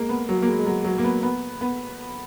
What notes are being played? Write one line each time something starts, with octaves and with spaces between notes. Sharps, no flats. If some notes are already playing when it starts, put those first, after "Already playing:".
Already playing: G#3 A#3
B3
F#3
A#3
G#3
G#3
F#3
F#3
A#3
B3
B3
B3